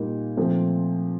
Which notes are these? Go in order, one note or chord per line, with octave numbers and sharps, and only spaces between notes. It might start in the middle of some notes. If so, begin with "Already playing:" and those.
Already playing: A#2 G3 A#3 D#4
A#2 F3 A3 C4